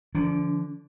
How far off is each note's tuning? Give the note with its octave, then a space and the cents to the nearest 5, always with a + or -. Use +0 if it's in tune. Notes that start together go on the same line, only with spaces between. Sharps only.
D3 +0 F3 -30 D4 -40